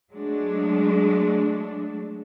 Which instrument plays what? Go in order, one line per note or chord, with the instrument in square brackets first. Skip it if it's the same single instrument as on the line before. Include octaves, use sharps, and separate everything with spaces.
[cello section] F#3 G#3 A3 D4